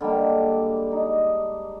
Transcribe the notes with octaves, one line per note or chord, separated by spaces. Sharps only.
D3 G3 G#3 A#3
D#4